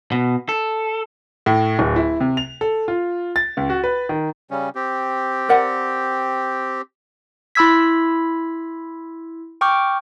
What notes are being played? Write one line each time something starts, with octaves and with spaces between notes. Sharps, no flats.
B2
A4
A2
D1
E4
C3
F7
A4
F4
A6
C#2
F#4
B4
D#3
C#3 G3 C#4
C4 G4
A#4 D5 F#5
E4 B5 C6 E6 G#6 B6
G5 C#6 D6 F6 G6